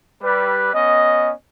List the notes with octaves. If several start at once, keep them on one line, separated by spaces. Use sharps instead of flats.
G3 B4
B3 C#4 D#5